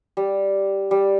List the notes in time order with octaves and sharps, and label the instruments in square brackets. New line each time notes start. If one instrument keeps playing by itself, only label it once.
[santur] G3
G3